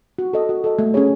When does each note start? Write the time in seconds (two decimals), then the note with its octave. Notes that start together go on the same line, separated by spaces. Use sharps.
0.18 F#4
0.33 A4 D#5
0.49 F#4
0.64 A4 D#5
0.79 A3
0.94 C#4 G#4 C#5